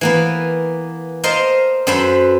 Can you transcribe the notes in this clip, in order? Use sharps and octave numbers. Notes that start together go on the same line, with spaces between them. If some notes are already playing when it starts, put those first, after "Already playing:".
E3 A#3 B3
A#4 C5 D#5 F5 A5 C6
F#2 A4 B4 C5 E5 F#5